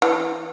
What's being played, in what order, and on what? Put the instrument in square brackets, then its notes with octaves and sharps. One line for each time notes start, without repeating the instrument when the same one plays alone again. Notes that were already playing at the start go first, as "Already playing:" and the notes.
[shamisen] E3